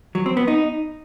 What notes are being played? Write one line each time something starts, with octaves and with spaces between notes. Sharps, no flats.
F#3
C4
B3
D#4